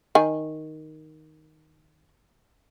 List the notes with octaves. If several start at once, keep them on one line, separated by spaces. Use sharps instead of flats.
D#3 G#5